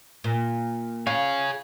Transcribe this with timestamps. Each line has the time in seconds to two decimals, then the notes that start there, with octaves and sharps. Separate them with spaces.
0.24 A#2
1.07 G#4 C#5 F5